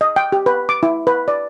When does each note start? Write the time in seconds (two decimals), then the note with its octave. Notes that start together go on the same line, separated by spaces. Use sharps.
0.01 D#5
0.16 G5
0.32 G4
0.46 B4
0.69 D6
0.83 E4
1.07 B4
1.28 D5